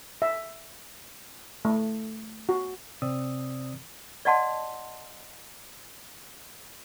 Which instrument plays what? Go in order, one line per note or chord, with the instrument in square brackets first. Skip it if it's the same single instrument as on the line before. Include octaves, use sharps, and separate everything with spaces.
[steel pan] E5
A3
F#4
[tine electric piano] C3 C4 D5 D#6 E6
[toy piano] D5 D#5 F#5 A5 C6